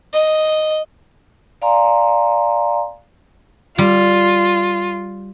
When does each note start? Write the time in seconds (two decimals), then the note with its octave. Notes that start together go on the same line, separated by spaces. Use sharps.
0.13 D#5
1.62 D5 F5 G#5 A#5 C6
3.78 G3 F4